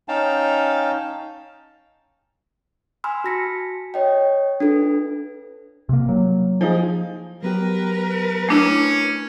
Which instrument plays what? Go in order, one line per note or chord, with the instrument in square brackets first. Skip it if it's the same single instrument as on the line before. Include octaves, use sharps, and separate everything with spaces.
[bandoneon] C#4 D#4 F5 G5 A5
[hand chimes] G#5 B5 C6 E6 F6
F#4 A5 A#6 B6 C#7
C#5 D#5 G5
D4 F4 A4 B4
[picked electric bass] C3 A#3
F#3 A#3
[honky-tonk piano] F3 D#4 G#4
[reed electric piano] F#3 B3 G4 [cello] A#4 B4
[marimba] A3 D4 E4 [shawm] C#4